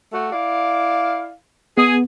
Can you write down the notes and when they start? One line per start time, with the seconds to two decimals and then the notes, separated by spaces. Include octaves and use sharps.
0.13 A3 F#4
0.32 E4 D5 F5
1.78 B3 G#4